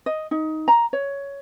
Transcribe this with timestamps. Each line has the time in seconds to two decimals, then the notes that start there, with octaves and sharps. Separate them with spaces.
0.06 D#5
0.31 D#4
0.68 A#5
0.93 C#5